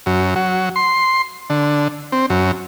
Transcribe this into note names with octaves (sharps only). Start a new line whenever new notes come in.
F#2
F#3
C6
D3
C4
F#2